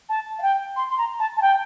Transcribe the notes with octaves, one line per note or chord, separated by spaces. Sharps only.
A5
F5
G5
C6
C6
A#5
A5
A5
G5